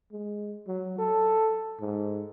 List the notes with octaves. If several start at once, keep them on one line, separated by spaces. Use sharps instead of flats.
G#3
F#3
A4
G#2